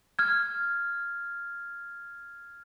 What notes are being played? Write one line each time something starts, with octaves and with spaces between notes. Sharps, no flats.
F6 G#6